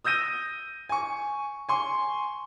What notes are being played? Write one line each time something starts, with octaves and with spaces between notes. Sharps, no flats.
D#6 E6 G6 A#6 D#7
G#5 C#6
G#5 C6 C#6